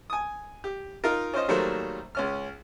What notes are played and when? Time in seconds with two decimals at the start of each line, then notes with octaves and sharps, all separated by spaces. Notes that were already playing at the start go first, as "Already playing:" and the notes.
0.10 G#5 D#6
0.64 G4
1.04 D#4 F4 A#4
1.33 C#4 F4 C5 D#5
1.48 D#3 F#3 G3 A3 A#3 C5
2.15 C#2 C#4 F6